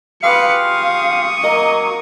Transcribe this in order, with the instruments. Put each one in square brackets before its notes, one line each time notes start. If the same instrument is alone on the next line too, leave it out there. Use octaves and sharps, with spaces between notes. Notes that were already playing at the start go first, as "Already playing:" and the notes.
[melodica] F4 G4 G#4 [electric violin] B4 C#7 [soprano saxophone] F5
[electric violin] C#6 D#6
[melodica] F#3 A#3 [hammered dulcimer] A#4 [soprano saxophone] D#5